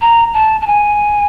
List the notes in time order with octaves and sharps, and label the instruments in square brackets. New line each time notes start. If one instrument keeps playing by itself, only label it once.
[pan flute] A#5
A5
A5
G#5